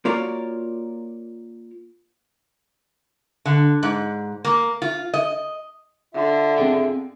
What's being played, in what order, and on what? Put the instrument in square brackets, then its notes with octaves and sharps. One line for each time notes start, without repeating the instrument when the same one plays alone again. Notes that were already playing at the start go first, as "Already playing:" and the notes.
[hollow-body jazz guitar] A#3 F4 F#4 A#4 C#5 D5
[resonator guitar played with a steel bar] D3
G#2
A#3
F4
D#5
[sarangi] D3 [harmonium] F4 E5
[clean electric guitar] C4 G#4 G5